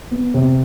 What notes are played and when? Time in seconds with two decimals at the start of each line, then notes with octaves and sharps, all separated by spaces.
0.11 B3
0.34 C3